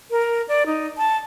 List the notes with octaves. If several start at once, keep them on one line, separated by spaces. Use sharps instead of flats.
A#4
D5
D#4
A5